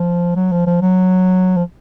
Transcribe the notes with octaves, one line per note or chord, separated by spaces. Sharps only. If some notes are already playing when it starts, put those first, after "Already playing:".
Already playing: F3
F#3
F3
F3
F#3
F3